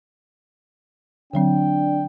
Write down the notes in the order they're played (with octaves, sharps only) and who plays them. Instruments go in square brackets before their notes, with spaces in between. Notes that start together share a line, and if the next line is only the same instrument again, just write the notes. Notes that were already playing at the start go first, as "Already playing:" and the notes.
[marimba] D3 F#3 C4 [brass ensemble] D4 G5